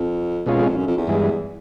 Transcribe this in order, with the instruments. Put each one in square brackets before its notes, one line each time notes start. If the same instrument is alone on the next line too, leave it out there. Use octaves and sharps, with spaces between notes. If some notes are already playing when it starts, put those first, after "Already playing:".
Already playing: [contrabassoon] F2
[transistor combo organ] B2 G#3 C#4 F4
[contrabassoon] F2
F2
F#2
F2
E2
[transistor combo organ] G2 E3 G#3